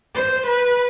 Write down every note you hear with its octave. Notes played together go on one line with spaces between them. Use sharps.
C5
B4